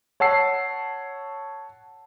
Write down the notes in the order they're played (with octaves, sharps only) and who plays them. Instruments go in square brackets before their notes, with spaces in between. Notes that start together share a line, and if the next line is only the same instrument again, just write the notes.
[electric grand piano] C#5 F#5 A5 E6 C7